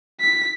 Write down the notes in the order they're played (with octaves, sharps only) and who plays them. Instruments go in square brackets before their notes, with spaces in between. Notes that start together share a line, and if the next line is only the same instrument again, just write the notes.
[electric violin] B6